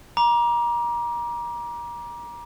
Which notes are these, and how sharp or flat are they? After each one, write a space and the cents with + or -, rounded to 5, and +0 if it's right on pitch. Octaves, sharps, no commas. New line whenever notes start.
A#5 +30 D6 +0